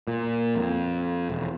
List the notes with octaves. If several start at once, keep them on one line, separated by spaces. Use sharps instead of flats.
A#2
F2
E1